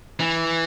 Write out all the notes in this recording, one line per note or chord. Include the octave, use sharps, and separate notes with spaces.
E3